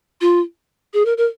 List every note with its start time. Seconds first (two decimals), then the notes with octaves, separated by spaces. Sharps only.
0.21 F4
0.94 G#4
1.05 A#4
1.18 A#4